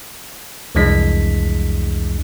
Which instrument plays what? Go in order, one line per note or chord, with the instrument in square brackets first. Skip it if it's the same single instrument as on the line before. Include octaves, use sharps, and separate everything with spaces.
[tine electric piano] C2 F2 E3 G#3 D4 B6